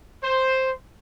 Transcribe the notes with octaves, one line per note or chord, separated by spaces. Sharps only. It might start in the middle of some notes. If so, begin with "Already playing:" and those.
C5